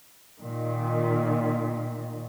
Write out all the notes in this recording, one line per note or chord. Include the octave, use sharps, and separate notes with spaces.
A#2 D#3